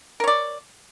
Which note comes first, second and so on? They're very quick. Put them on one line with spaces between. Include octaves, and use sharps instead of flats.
A#4 C#5 D5